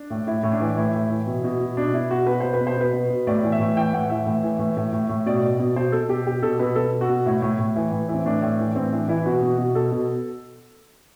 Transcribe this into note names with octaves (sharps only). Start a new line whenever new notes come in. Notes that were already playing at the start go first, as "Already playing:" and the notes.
Already playing: D4
A2
A2 E4
A2
D4
E3
A2 E4
A2
E3
B2
B2
B2
B2 D4
B2 E4
B2 F#4
B2 B4
B2 C5
B4
B2
C5
B2 B4
B2
B2
A2 D5
E3
E5
A2
E3 G5
A2 F#5
E3 E5
A2
E3
A2
A2
A2
A2
B2 D5
B2
B2
B2 C5
B2 A4
B2 G4
B2 G4
B2 A4
B2 B4
B2 A4
B2
F#4
B2
A2 E4
A2
A2
E3
A2
E3
C4
A2 D4
A2
E3
A2 C4
E3 D4
E3 E4
B2 F#4
B2
B2
B2 A4
B2